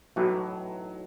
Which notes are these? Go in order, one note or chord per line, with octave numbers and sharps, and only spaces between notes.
B1 A2 E3 F#3